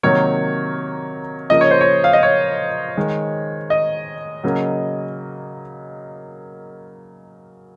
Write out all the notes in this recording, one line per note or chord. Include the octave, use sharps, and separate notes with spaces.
C3 D#3 F#3 A#3 C#5
C#3 F3 A#3 D#5
C#5
C5
C#5
F5
D#5
C#5
D#3 G#3
D#5
C#3 F#3 A#3